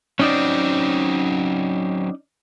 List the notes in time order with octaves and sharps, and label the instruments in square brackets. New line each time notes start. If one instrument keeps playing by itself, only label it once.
[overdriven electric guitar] F#3 C4 [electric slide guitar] C#4 D#4 D5